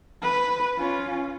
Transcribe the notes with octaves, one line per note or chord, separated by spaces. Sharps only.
B4
C#4 F4